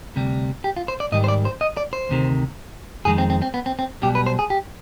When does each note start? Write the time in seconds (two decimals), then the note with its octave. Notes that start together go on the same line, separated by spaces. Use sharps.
0.16 D2 C3 G3
0.64 G4
0.77 F4
0.88 C5
1.00 D5
1.12 G#2 D#3 G3 D#5
1.24 C5
1.28 D5
1.45 C5
1.61 D#5
1.77 D5
1.93 C5
2.09 D2 C3 D#3
3.05 F2 D#3 G#3 G#4
3.18 C4
3.30 C4
3.42 C4
3.54 B3
3.66 C4
3.79 C4
4.02 B1 B2 G3 G4
4.15 B4
4.26 C5
4.39 G#4
4.50 G4